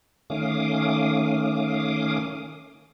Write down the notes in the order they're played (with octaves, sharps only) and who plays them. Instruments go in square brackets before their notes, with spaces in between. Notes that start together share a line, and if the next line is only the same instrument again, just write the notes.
[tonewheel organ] D#3 A3 C#4 F5 D6 D#6